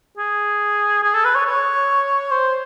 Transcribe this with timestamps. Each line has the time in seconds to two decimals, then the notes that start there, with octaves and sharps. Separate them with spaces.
0.17 G#4
1.03 G#4
1.14 A4
1.25 B4
1.35 C#5
1.46 C#5
2.31 C5